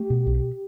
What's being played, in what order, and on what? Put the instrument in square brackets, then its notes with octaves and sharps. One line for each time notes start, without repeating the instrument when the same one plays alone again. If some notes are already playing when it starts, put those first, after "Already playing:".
Already playing: [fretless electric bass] A3 [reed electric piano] G4
[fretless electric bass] B2
B1